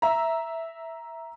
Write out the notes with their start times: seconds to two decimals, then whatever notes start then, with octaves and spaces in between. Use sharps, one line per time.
0.02 E5 A#5